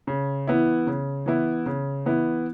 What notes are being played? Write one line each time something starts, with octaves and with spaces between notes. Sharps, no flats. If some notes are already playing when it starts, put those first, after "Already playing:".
C#3
E3 B3 E4
C#3
E3 B3 E4
C#3
E3 B3 E4